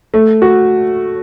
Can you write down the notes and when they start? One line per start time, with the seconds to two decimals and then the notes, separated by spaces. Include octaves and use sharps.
0.14 A3
0.42 F#4